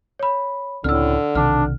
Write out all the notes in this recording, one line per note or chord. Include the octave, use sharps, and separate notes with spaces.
C#5 B5
C#2 A2 D3 C4 C#4 E6 F6
B1 C3 D#3 D4 F6